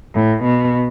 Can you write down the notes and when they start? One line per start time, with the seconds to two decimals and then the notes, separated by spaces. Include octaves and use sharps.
0.14 A2
0.44 B2